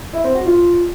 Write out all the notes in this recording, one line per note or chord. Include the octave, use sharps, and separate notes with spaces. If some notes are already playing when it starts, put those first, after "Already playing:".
E4
C4
F#4
F4